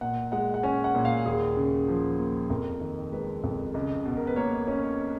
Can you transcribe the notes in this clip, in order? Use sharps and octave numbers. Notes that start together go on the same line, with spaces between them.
A#2 F#5
G#3 F#5
F#5
C#4 G#5
F#5
A#2
F5
D#2 G#4
C#3
F3
A#3
F2 A#4
D#3
G#3 B4
F2
C#2
B2
A#4
B4
A#3 C#5
C#4